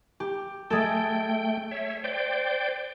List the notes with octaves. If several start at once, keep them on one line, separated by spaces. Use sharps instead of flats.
G4
G#3 A3 G#4 A4 G5
C#5 E5
C5 D5 G5